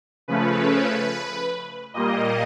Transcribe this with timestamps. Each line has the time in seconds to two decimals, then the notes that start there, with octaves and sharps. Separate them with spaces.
0.28 C#3 F3 A3 C#4 B4
1.94 A#2 G3 A#3 D#5